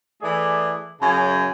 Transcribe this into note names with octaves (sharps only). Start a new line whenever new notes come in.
E3 A3 G#4 D5
F#2 C#3 G#5